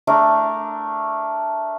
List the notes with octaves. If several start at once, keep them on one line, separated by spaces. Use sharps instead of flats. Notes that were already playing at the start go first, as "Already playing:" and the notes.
A3 D4 A#4